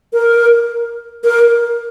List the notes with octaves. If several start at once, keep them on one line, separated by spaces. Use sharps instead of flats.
A#4
A#4